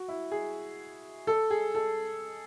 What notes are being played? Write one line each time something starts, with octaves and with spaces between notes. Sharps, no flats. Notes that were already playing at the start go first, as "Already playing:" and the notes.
Already playing: F#4
E4
G#4
A4
G#4
A4